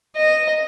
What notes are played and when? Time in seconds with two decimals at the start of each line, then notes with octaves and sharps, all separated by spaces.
0.17 D#5